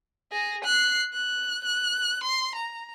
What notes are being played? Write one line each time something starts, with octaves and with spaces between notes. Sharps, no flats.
G#4 A#6
F#6 C7
F#6
F#6
C6
A#5